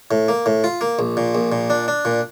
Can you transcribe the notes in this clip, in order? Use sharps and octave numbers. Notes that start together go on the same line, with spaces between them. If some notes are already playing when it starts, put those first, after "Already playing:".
A2
A#3
A2
F4
A#3
A#1
A#2
A#1
A#2
D4
D4
A#2